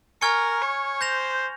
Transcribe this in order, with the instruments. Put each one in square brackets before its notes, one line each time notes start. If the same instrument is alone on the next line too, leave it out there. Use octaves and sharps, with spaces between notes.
[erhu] A#4 [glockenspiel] G#5 C#6 F6 G#6 C#7
[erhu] C#5
[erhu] C5 [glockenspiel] G6 A#6 F7